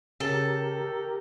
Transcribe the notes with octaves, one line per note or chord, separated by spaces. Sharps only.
C#3 G4 A4 A#4